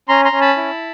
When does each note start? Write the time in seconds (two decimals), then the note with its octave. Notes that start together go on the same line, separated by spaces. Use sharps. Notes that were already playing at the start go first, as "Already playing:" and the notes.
0.09 C#4 A#5 C6
0.25 A#5 C6
0.33 C#4
0.41 A5 B5
0.57 E4